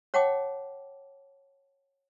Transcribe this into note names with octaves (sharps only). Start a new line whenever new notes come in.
C#5 F#5 G5 A5 D6